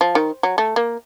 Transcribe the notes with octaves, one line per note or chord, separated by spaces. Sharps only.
F3
D#3
F#3
A3
A#3